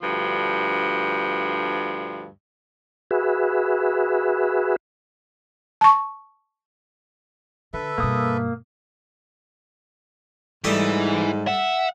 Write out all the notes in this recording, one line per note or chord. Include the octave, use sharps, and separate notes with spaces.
D2 G2 F3
F#4 G#4 B4 E5
A5 C#6
D3 A4 B4 E5
G2 B2 A#3 D#6
G#2 E3 G3 A3 D#4
E5 F#5